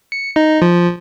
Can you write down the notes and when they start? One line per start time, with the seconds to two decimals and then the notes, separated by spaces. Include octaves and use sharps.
0.12 C#7
0.36 D#4
0.62 F3